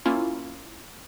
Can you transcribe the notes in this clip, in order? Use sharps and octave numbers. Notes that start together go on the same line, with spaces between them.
A#3 C#4 E4 F4